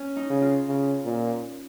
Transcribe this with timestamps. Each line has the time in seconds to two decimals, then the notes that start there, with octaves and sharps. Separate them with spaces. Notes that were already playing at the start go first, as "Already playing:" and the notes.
Already playing: C#4
0.16 D#4
0.30 C#3
0.42 F4
0.68 C#3
1.05 A#2